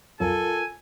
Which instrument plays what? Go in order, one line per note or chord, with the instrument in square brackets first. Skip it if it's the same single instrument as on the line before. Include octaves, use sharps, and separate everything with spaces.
[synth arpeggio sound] B1 F2 F#3 [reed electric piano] F4 A#4 [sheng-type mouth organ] A4 [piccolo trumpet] G#5